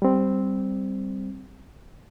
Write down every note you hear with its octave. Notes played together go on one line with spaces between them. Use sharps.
G3 C4